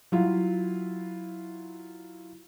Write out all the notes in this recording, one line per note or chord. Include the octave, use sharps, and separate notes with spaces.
F#3 E4 F4